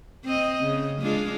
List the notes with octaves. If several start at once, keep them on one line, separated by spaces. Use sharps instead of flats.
C4 D#5
C#3
G#3 D4 F4